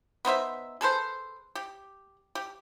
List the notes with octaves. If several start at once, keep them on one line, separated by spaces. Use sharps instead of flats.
B3 D#4 C5 E5
G#4 A4 B4 C5
G4
G4